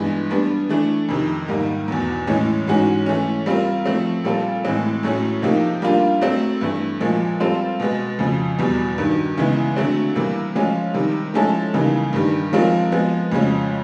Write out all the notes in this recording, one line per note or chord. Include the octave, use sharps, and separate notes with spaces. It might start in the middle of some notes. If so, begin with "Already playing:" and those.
Already playing: G2 E3 G#3 B3
G3 B3 D4
E3 A3 D4
F2 C3 D#3
G#2 D#3 G3 A#3
E2 B2 F#3
A2 E3 G#3 C#4
G#2 E3 G#3 C#4 F#4
E3 A3 C#4
G3 C4 F4 A#4
F3 A3 C4
A#2 G3 C4 F4 A4
A2 E3 G#3 C4
A2 F#3 A3 C#4 E4
C3 F3 A#3 D#4 G4
G3 A#3 D4 F4
F#3 A3 C4
G2 E3 A3
A#2 F3 G#3
G3 C4 F4 A4 C5
B2 G#3 B3
F2 C#3 F3
E2 B2 G3
G2 D#3 F#3
C#3 E3 G#3 B3 E4
D3 F#3 A3 C4
C3 E3 G3 A#3
F3 G#3 C#4 F4
C3 D#3 G3
F3 G#3 C#4 E4 A4
C#3 E3 G3 A#3 D#4
G2 D#3 G3
F3 G#3 C4 F4 A#4
F3 G#3 B3
F2 C#3 F3 G#3 C#4